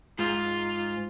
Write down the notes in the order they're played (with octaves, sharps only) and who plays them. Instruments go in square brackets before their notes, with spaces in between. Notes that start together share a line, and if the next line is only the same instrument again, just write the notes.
[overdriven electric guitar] G#2 [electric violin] F4